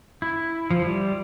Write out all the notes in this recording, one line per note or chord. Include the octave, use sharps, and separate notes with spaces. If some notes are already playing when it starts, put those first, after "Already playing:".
E4
F3
G3